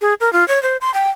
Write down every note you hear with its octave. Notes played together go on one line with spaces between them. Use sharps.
G#4
A#4
F4
C#5
C5
C6
G5